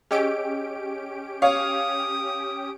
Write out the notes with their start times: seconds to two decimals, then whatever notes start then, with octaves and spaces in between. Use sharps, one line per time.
0.11 C#4 G4 G#4 D#5 E6 D7
1.42 C#5 F5 D#6